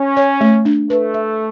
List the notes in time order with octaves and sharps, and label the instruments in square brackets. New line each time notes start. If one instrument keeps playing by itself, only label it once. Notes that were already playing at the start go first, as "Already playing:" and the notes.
Already playing: [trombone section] C#4
[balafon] C#5
A3
D4
[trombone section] A3 [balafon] B4
[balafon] E5